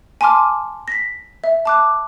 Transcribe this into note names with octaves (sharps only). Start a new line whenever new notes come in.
G#5 A5 C6 D6 F6
A#6 B6
E5
A5 D6 F#6